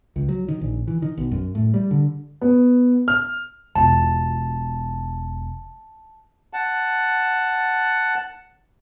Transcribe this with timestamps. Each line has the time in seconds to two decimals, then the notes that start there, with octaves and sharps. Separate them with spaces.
0.16 C#2
0.29 F#3
0.48 D#3
0.61 A#1
0.88 E3
1.02 D#3
1.17 B1
1.31 F#2
1.55 A2
1.74 G3
1.91 D3
2.41 B3
3.08 F6
3.75 E1 F4 A5
6.53 F#5 A5